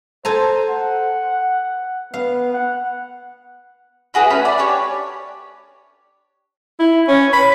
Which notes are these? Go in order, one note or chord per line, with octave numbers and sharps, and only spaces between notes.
A4 C5 G#5 A#5
F#5
B3 F5
F#5
E4 F#4 G#4 B4
A3 C#4 B4 B5
D5 B5
D4 G4 C#5
E4
C#4
B5